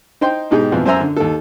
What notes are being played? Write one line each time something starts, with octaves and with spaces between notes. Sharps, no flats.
D#4 C5 G5 C6
G#2 B2 D#4 G4 G#4 G5
F2 B2 E3 F3
F#2 C5 E5 G#5 A#5 E6
D3
D#2 A4